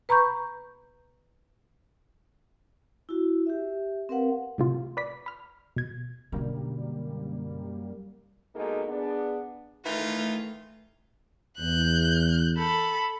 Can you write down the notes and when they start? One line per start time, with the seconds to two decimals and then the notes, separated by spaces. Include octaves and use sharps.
0.09 B4 A#5 B5 C#6 G6
3.09 E4 F#4
3.46 G4 E5
4.09 C4 A#4 B4 F5 F#5
4.58 A2 C3 F4
4.97 B4 D5 B6
5.26 B5 F6
5.76 B2 G#6
6.32 F#2 B2 D3 G3 A#3
8.55 B2 G#3 A#3 D#4 G#4 A4
8.88 B3 D4 G#4
9.84 D#3 E3 A3 F4
11.59 E2 F#6 G6
12.57 A4 B5